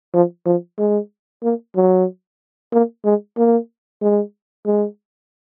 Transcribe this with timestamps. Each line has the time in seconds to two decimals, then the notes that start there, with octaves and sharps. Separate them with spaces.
0.14 F3
0.46 F3
0.79 G#3
1.43 A#3
1.76 F#3
2.72 A#3
3.05 G#3
3.37 A#3
4.01 G#3
4.66 G#3